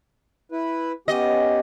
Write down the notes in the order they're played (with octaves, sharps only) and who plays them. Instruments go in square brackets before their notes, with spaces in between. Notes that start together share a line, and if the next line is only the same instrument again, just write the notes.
[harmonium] E4 B4
[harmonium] B3 C#4 G4 [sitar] D#5